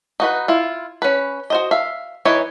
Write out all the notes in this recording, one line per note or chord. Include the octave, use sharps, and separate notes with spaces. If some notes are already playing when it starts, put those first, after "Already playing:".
D#4 F#4 B4
E4 F4
C#4 B4
F#4 C5 D#5
E5 F5
E3 D#4 B4 C#5